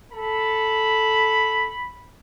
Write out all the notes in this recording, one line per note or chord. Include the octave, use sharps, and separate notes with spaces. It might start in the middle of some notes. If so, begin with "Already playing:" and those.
A4 B5